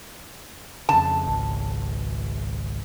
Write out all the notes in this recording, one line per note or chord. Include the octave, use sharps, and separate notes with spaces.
F2 C#3 A5
G#1 C#2